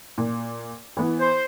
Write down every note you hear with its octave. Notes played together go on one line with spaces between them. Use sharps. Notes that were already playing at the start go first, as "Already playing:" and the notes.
A#2
E3 B3
C5